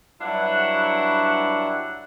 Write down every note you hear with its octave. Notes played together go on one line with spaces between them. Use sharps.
G2 F#3 D4 E4 F#5